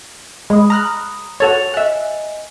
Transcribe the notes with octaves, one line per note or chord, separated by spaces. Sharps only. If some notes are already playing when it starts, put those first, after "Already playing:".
G#3 B5 D#6
A#5 F6 F#6
F#4 A4 C#5 A6 F7
D#5 E5 F#5 G#5